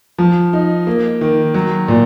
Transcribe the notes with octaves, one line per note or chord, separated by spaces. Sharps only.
F3
D#4
A#3
D#3
F#3
A#2